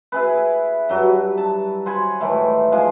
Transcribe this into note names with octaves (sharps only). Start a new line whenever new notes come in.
E4 G#4 B4
G2 F#3
A5
C5 F#5 G#5 B5
A2 D#3 E3 A3
F3 G#3 G#4